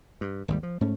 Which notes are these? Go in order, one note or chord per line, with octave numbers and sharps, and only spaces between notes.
G2
G#1 D#2 G3
F3
G#2 A3 C#4